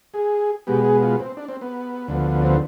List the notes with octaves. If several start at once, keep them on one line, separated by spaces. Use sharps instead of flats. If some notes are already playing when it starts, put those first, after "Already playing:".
G#4
B2 G#3 B3 G4
G#4
F4
C4
D4
C4
B3
D2 D3 F3 B3
C4